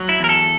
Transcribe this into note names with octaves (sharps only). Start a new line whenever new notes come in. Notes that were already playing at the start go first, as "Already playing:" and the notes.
Already playing: F#3
E4
E2 A#4
A4